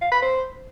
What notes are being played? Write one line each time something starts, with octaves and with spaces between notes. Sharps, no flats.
F5
B5
C5